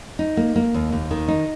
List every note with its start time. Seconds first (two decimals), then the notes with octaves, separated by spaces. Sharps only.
0.19 D#4
0.37 A#3
0.56 A#3
0.74 D#2
0.92 D#2
1.11 D#3
1.28 D#4